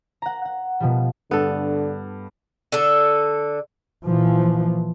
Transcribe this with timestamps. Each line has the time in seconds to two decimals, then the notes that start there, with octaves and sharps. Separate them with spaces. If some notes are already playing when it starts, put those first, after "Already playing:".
0.22 F#5 A#5
0.45 F#5
0.80 B2 F3 G3
1.31 G2 D3 B3 A4
2.72 D3 A4
4.05 A#2 E3 F3